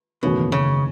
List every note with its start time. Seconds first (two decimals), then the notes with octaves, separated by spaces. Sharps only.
0.23 F#1 E2 B2 D#3 A3 C#4
0.52 C#3